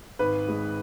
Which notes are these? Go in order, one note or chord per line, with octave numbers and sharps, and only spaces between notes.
G#1 B4
G#3